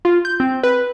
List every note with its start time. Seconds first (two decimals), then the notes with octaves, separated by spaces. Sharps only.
0.05 F4
0.25 G6
0.40 C4
0.63 B4